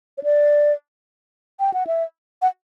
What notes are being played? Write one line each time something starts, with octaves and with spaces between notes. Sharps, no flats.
C#5
D5
G5
F#5
E5
F#5